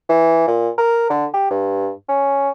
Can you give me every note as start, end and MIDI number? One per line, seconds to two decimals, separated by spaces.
0.09 0.47 52
0.47 0.69 46
0.78 1.06 70
1.10 1.26 50
1.34 1.48 67
1.51 1.91 43
2.09 2.49 61